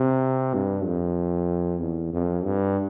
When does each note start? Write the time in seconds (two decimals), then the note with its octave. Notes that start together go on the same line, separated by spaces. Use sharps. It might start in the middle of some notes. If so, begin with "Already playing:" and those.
Already playing: C3
0.54 G2
0.85 F2
1.80 E2
2.13 F2
2.44 G2